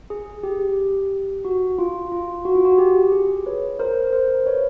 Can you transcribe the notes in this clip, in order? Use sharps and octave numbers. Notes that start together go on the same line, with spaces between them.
G#4
G4
F#4
F4
F4
F#4
F4
F#4
G4
G#4
B4 C#5
A#4 C5
A#4 C5
B4 C#5